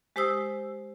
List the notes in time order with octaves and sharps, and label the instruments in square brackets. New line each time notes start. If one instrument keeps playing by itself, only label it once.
[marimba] G#3 G4 C5 D#6 E6